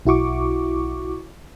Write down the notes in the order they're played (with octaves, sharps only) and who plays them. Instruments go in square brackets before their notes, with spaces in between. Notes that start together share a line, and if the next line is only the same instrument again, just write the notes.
[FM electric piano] B1 E4 F#4 C#6 D6